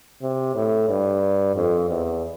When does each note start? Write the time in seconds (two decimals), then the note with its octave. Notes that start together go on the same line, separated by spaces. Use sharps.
0.22 C3
0.55 A2
0.89 G2
1.56 F2
1.90 E2